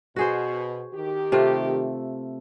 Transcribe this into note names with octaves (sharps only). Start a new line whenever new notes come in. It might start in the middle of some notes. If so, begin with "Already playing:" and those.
B2 F#4 G#4 C5
D#3 G4
C3 A3 F4